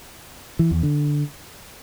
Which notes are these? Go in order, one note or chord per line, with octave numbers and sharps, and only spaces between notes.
E3
E2
D3